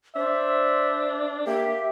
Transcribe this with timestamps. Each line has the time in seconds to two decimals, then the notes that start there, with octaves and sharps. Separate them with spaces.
0.16 D4 C5 E5
1.47 A#3 G4 E5